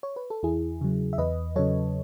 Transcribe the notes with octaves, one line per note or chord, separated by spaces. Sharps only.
C#5
B4
A4
E2 E4 G#4
C#3 F#3
E5
E2 B4 D#5
C#3 F#3 A4 C#5